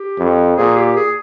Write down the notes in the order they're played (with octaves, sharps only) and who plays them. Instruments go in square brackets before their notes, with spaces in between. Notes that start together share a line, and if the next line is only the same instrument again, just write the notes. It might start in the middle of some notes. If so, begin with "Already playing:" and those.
Already playing: [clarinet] G4
[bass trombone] F2
[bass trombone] A#2 [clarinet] G#4
[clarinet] G4
G#4